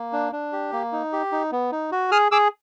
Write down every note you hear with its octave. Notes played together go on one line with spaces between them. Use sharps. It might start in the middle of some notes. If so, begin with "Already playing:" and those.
Already playing: A#3
D4
D4
G4
A#3
D#4
G4
D#4
B3
D#4
F#4
G#4 D#6 F6
G#4 D6 E6